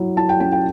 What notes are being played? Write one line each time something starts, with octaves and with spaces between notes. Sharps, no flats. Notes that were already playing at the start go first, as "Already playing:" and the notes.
Already playing: F#3 E4
E4 A5
G5
C#4 G5
G5